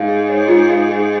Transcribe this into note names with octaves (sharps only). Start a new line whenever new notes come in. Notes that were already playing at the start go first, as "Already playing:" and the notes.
Already playing: G#2 F5
G#4
C#5
F4
F5
G#4